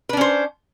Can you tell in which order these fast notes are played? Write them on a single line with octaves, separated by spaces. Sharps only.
B4 D4 C#4 C5